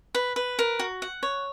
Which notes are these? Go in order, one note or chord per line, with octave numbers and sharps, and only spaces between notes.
B4
B4
A#4
F#4
F#5
C#5